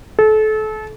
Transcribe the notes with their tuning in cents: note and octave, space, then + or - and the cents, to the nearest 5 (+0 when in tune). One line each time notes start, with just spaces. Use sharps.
A4 -30